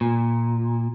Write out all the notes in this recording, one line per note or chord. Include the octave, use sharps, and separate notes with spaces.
A#2